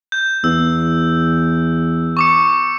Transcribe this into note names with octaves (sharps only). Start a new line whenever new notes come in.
G6
E2 E6
C#6 D6 C#7